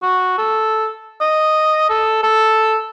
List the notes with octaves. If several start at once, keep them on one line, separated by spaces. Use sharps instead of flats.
F#4
A4
D#5
A4
A4